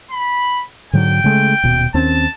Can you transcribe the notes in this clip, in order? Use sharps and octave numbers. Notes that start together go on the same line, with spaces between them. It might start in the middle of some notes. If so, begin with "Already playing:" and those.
B5
G#2 D3 F#3 G5
C#3 G#3 A3
D#1 B2
D#2 C4 C#4 A5